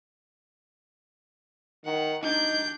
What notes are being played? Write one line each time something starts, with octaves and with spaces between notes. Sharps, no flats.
D#3 F#5
D4 D#4 G6